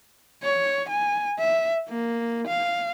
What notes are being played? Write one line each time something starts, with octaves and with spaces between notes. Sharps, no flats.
C#5
G#5
E5
A#3
F5